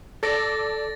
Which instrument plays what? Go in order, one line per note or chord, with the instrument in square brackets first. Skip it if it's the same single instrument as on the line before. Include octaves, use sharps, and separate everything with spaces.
[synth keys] A4 D5 D6 [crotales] A6 A#6